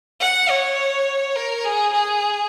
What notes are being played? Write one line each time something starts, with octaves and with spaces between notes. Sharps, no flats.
F#5
C#5
A#4
G#4
G#4